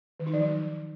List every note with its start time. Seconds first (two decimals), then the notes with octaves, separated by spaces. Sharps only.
0.20 D#3
0.27 D#4
0.34 F3
0.41 F#3